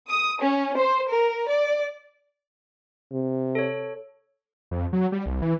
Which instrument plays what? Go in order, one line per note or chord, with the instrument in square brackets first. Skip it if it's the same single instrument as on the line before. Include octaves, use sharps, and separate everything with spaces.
[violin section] D#6
C#4
C5
A#4
D5
[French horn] C3
[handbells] A4 C#5
[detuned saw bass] F2
F#3
G3
C2
E3